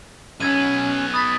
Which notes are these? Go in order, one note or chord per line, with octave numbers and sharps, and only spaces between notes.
B1 B3 C#4 E6 G#6 D#7
B5 D#6 A6 B6